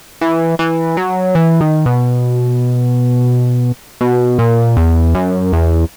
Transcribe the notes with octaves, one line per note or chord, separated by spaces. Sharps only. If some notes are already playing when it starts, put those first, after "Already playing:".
E3
E3
F#3
E3
D#3
B2
B2
A#2
E2
F#2
E2